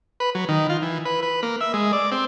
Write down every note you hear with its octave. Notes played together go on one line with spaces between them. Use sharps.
B4
F#3
D#3
F4
E3
B4
B4
A#3
E5
G#3
D5
C4